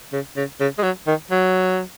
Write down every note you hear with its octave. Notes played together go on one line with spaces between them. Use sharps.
C#3
C#3
C#3
G#3
F#3
D#3
F#3